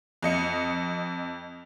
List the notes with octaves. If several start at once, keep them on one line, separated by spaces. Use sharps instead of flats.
F2 D#5 C#7